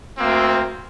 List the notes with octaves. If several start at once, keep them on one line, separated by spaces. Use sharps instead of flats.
D2 A#3 C4